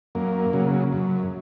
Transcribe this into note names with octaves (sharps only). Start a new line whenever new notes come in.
F#2 A#3
C#3 F#3
F#2